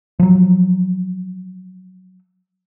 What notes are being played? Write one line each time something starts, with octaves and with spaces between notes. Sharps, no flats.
F3 F#3